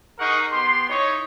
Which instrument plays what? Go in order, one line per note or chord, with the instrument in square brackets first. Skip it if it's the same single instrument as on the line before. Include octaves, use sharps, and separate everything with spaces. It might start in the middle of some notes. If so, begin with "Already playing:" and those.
[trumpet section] D#4 G#4 A#4 F#5 C#6
B3 G4 C6
D#4 E4 C#5